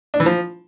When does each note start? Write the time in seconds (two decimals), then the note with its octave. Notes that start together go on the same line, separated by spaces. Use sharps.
0.14 D4
0.20 E3
0.26 F3